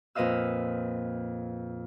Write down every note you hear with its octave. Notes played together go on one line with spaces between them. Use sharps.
F2 A#2 B4 D#5 F5 E6